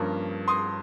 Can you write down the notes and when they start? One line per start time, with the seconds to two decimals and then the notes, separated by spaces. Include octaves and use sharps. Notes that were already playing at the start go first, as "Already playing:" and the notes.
Already playing: G2 F3 A#3 C#4
0.48 C6 D#6